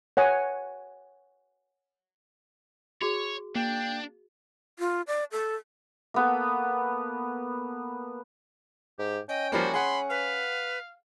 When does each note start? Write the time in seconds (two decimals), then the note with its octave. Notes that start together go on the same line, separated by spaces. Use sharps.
0.17 C#5 F#5 G#5 C#6 D#6
3.02 F#4 G#4 C#5
3.56 A#3 D4 G5
4.79 F4
5.07 D5
5.32 A4
6.14 A#3 B3 A4
8.99 G#2 G4
9.29 C#4 D#5 G5
9.52 F3 G3 A#3 F#4 C5
9.73 G#4 F#5 B5 C6
10.10 B4 F5